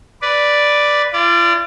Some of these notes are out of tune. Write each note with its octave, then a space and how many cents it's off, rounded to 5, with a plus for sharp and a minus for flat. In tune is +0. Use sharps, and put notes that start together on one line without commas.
B4 +0 D5 +0
F4 -40 D5 +0